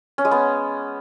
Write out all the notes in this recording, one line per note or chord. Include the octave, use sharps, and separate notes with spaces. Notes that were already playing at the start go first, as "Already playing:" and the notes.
C#4
G#3
B3